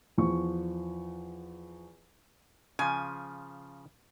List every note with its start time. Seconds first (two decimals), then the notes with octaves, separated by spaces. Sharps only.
0.18 E2 F3 C#6
2.79 C#3 F3 G#5